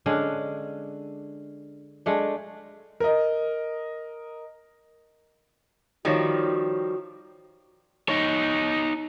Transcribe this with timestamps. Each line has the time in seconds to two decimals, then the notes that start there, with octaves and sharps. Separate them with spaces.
0.06 D3 G#3 C#4 D4
2.06 G#3 A3 D4
3.00 A#4 D#5
6.05 D#3 F3 G3 F4 F#4 C#5
8.09 D#4 C#5